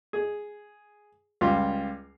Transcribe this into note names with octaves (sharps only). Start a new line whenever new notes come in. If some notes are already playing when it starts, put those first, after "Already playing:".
G#4
C#2 G3 F4